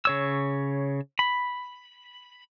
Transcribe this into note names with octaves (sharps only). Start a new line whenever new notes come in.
C#3 C#5 E6
B5